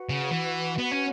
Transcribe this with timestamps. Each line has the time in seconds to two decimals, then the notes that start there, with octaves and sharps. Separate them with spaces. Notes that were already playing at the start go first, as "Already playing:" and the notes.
Already playing: F#4 B4 F#5
0.10 C#3
0.31 E3
0.79 B3
0.92 C#4